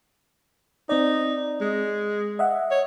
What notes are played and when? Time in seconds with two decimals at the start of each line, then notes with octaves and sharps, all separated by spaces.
0.89 C4 D#4 D5
1.61 G#3
2.39 D#5 E5 F#5
2.71 C#5